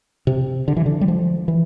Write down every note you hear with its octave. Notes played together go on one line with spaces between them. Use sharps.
C3
D3
E3
D3
G3
F3
E3